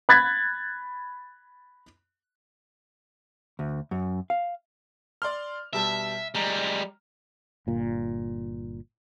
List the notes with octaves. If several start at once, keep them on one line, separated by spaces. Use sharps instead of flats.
B5 F#6 G#6 A6 B6
D2
F#2
F5
D5 C6 F6
B2 G3 E5 A5
G3 G#3 A#5
G1 A#2